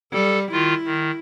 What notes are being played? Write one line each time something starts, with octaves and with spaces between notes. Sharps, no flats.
G3 A4
D#3 E4 F4
D#3